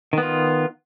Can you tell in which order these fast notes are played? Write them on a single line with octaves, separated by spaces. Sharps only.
D#3 B3 F4